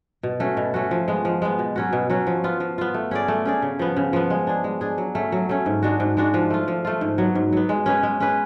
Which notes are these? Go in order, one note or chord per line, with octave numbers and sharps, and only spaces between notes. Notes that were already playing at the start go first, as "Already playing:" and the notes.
B2
A3 C#4 F#4
B2
A3 C#4 F#4
F3
G#3 B3
F3
G#3 B3
B2
F#3 C#4 F#4
B2
F#3 C#4 F#4
F3
B3 F4
F3
B3 F4
A3
C#4 G#4 D5
A3
C#4 G#4 D5
C#3
F3 B3
C#3
F3 B3
G#3
D4 G#4
G#3
D4 G#4
F#3
A3 C#4
F#3
A3 C#4
G#2
G#3 D4 F#4
G#2
G#3 D4 F#4
F3
A3 F4
F3
A3 F4
G#2
F#3 B3
G#2
F#3 B3
G#3
C#4 G#4 B4
G#3
C#4 G#4 B4